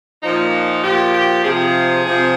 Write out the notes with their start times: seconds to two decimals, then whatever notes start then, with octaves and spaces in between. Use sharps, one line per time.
0.23 A#2 F3 D#4
0.83 A#2 F3 G4
1.14 G4
1.44 C3 F3 G#4
2.05 C3 F3